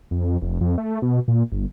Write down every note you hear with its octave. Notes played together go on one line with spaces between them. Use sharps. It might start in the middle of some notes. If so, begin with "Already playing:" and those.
F2
F1
F2
A3
B2
A#2
G1